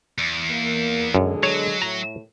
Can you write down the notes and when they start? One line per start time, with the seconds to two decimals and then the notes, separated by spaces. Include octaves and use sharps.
0.18 E2
0.49 A#3
1.15 F#2 B2 D3 G#3
1.43 F#3 C#5
1.82 A2 A#5